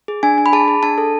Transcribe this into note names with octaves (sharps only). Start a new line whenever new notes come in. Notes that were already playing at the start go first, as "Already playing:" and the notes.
G#4
D4 G#5
D4
B5
G#4 A5
G#4
D4 A5
A4